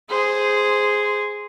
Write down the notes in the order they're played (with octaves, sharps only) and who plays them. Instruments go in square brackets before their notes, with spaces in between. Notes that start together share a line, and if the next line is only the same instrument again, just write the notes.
[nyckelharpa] G#4 [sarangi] C5